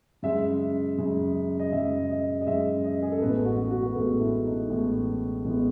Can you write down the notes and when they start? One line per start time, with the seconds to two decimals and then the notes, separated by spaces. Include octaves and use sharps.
0.22 F#2 C#3 G#3 E5
0.98 F#2 C#3 G#3
1.59 D#5
1.72 F#2 C#3 G#3 E5
2.09 D#5
2.41 D#5
2.46 F#2 C#3 G#3 E5
2.84 D#5
3.02 G#4
3.12 A4
3.22 A1 A2 G#3 B3 B4
3.45 F#4
3.71 F#4
3.86 B4
3.95 A1 A2 G#3 B3 A4
4.20 E4
4.46 D#4
4.70 A1 A2 G#3 B3
5.45 A1 A2 G#3 B3